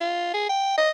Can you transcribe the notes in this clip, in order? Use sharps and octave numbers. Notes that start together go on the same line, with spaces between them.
F4
G#4
G5
D#5